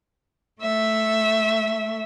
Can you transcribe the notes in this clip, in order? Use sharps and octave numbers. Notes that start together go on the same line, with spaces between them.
A3 E5